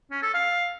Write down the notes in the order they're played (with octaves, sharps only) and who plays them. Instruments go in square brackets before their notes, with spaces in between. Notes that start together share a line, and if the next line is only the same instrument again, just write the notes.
[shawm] C#4
A4
F5